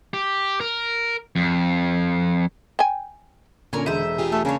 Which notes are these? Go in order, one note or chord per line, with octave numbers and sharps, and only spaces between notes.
G4
A#4
F2
G5 G#5
A#2 D3 C#4 A#4 C#5 G#5
E1 G#3 C5 E5 D#7
F4 G4 G#4
A3 A4
C#3 A#3 D4 C#5